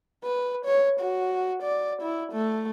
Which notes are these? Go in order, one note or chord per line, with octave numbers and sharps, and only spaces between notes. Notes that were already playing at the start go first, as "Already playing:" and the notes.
B4
C#5
F#4
D5
E4
A3